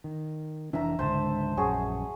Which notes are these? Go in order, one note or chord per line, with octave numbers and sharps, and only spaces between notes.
D#3
F1 E3 D4 E5 A#5
C#2 G#2 D3 C5 A5
A#1 F#2 F#4 G#4 C#5